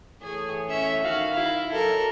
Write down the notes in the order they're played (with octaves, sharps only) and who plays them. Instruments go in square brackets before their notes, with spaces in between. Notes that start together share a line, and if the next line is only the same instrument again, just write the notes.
[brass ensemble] E3 A3 C#5 [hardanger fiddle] G#4
[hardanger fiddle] C#4 E5
[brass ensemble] D#3 F5 [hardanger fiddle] F#4
[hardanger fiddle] E4
[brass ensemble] F#3 G#3 A#3 [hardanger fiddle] A4 A#4